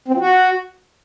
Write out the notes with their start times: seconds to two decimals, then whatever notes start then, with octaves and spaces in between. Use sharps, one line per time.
0.08 C4
0.14 F3
0.20 F#4